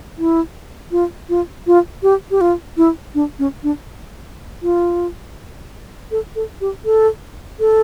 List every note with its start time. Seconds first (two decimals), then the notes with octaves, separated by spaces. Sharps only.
0.18 E4
0.92 F4
1.29 F4
1.67 F4
2.03 G4
2.31 G4
2.41 F4
2.77 E4
3.15 D4
3.39 C#4
3.63 D4
4.62 F4
6.11 A4
6.36 A4
6.61 G4
6.85 A4
7.60 A4